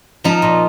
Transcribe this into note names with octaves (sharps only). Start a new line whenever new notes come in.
F3 D#4
A#2